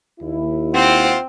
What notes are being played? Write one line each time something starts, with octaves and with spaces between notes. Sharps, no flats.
D#2 E4
C4 F4 C5 F#5